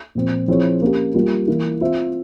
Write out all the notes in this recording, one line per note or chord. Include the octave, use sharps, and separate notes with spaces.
A#2 F3 C4
F3 C4 E4 G#4 C#5
A#3 C#4 G4
G3 A#3 F4
E3 A#3 E4
C4 F4 C5 E5